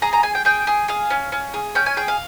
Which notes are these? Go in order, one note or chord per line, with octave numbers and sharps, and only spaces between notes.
G#4 A#5
A#5
G#4 G#5
G5
G#4 G5
G#4
G#4 F5
C#4
C#4
G#4
C#4 G5
G#5
G#4 G5
F5